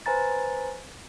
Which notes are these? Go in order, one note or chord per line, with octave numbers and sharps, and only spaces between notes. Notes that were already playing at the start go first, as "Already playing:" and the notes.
B4 C5 G#5 A#5 A6